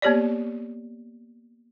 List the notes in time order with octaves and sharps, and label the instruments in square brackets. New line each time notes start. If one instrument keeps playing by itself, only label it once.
[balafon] A#3 B3 G4 C#5 D5